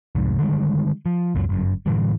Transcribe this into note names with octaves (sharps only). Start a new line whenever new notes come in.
C2 F2 G#2
D3 D#3 G3 G#3
F3
C#2 F#2 F#3
G1 F#2
A2 D3 E3 G3